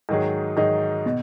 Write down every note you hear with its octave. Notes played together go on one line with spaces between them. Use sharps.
G#2 D#3 F#3 D#4 G#4
G#2 D#3 F#3 D#4 G#4
B2